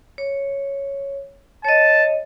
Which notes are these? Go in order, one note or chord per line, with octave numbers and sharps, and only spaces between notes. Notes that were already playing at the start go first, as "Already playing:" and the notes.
C#5
C#5 D#5 A5